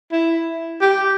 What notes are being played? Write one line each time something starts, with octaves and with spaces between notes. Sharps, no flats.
E4
G4